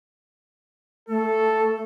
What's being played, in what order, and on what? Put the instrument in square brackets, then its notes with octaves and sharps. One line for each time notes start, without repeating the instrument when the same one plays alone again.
[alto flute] A3 [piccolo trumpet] A4